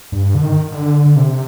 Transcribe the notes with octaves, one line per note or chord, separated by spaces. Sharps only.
G2
D3
D#3
D3
D3
C3